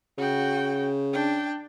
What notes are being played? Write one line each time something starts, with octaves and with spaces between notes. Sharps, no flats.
C#3 F#4 G5
D4 G5